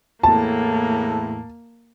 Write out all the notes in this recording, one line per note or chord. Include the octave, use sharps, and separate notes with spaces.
E2 A2 A#3 A5